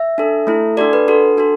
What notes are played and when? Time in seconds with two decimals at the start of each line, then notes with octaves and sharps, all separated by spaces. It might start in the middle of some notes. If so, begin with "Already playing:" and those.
Already playing: E5
0.18 D4 A4
0.47 A3 E4 A4
0.77 D4 F#4 A4 D5
0.93 B4
1.08 D4 F#4 A4
1.38 D4 F#4 A4